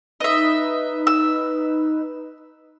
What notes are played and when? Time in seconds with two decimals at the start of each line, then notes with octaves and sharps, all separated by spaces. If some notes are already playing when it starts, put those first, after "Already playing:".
0.20 D#4 B4 D#5 E5
1.07 E6